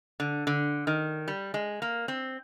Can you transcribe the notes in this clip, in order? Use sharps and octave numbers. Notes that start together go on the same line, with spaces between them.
D3
D3
D#3
G3
G#3
A#3
C4